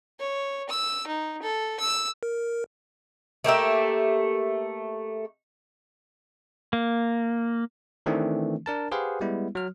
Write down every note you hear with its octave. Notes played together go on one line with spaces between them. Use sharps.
C#5
E6
D#4
A4
E6
A#4
A3 A#3 G4 E5
A#3
D#3 E3 A3 C4 D4
D4 A#4 A5
G4 G#4 B4 C5 F5 F#5
G3 G#3 B3 E4
F#3 F6